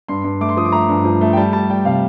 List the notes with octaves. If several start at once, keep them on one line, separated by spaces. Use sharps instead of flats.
G2 C6
G2
A3 D6
C6
F3 D#6
D6
A3 A#5
G2
F3
A3
G5
G3 A5
G3 A5
G3 G5
C3 F5